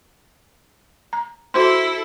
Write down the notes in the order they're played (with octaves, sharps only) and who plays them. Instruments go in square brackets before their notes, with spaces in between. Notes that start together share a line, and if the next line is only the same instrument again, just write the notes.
[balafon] A#5
[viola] E4 A4 [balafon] F#4 C5 C6